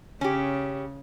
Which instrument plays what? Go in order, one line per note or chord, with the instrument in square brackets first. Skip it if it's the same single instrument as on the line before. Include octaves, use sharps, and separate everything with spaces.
[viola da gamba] C#3 [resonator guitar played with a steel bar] C#4 G4